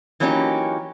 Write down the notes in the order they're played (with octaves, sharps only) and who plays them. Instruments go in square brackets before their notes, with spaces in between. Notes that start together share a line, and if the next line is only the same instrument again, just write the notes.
[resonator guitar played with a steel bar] E3 F#3 A#3 C#4 D#4 G4